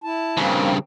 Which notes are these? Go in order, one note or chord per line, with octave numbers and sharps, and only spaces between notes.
E4 A5
G2 C#3 A#3 C4